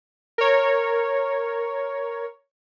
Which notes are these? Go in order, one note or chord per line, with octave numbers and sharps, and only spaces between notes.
A#4 C#5